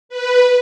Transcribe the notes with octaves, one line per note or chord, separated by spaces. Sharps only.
B4